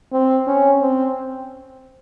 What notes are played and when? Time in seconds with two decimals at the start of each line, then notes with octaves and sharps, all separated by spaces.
0.12 C4
0.47 C#4
0.81 C4